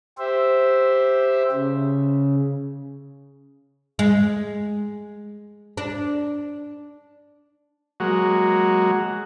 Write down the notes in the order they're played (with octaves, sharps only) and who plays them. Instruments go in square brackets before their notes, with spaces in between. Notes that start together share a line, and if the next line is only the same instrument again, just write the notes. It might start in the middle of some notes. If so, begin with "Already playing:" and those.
[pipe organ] G4 C5 E5
C#3
[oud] G#3
D4
[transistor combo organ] F#3 G#3 A#3 F#4